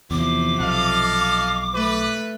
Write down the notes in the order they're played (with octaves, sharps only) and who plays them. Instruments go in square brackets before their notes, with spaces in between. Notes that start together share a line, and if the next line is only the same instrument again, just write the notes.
[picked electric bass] E2 [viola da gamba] C3 F3 [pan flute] D6
[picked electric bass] B1 [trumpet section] A4 D#5 F5
[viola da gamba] A3 [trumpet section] B4